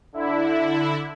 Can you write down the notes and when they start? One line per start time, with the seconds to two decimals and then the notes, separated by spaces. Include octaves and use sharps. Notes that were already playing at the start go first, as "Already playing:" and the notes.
0.13 D3 E4